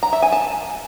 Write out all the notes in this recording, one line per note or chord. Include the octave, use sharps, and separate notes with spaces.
A#5
E5
G#5
A5